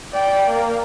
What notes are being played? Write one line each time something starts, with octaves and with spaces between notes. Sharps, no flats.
D5 G5
A#3